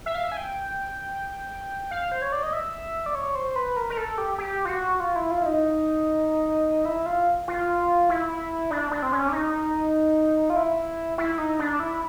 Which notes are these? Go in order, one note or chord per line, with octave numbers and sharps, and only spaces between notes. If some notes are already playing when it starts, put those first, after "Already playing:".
E5
F5
E5
G#5
G5
F5
C5
C#5
D5
D#5
E5
D5
C#5
C5
B4
A#4
A#4
A4
G4
G4
F4
F#4
F4
E4
F4
E4
D#4
E4
F4
F4
E4
D4
D4
C4
C#4
D4
D#4
F4
E4
E4
D#4
D4
E4